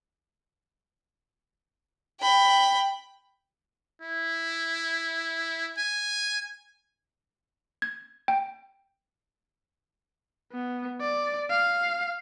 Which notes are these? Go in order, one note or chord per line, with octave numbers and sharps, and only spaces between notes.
G5 B5
E4
G#5
G#6
G5
B3
D5
F5